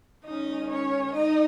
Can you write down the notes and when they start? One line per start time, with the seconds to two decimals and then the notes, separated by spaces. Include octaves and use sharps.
0.25 D#3 G#3 C#4 D#4 D#5
0.69 C#4 C#5
1.14 D#4 D#5